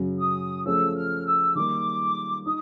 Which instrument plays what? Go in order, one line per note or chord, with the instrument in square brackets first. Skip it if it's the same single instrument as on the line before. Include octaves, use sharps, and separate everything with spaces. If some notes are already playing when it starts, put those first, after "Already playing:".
Already playing: [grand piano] F#2 C#3 F#3
[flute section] D#6
[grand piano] F3 A3 C#4 F4 G#4 [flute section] E6
[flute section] F6
E6
[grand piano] D#3 G3 A#3 [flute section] D6
[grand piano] D#4 [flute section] D#6